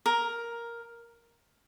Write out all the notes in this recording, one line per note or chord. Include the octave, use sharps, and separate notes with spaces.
A#4